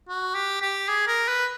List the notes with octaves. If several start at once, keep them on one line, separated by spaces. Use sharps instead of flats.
F#4
G4
G4
G#4
A#4
B4